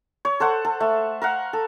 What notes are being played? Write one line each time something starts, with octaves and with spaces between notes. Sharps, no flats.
C#5
A4 C5 F#5
A4
A3
A#4 F5 F#5
A4